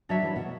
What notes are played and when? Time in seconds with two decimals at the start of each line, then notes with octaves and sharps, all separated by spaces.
0.09 F#3 D4 F#4 C#5 E5
0.22 E3
0.36 B2